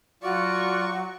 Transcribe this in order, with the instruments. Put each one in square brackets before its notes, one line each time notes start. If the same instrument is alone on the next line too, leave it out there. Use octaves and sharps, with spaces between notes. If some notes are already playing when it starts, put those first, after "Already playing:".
[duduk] F#3 [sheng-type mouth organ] F4 D5 [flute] F#4 [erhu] C#6